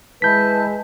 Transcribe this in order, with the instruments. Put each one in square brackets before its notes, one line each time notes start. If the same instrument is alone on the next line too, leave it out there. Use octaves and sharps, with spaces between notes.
[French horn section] G#3 [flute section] E4 B4 A5 [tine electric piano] G6 B6